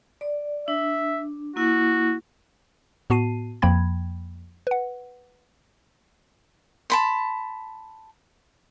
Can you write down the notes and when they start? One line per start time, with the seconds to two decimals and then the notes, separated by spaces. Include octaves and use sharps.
0.21 D5
0.68 D4 E5
1.56 A#3 E4 F#4
3.10 A2 B3 F#4 A5 C7 D#7
3.62 F2 F3 A#3 G5 B5 G#6
4.67 B4 F#5
6.90 A5 B5 C6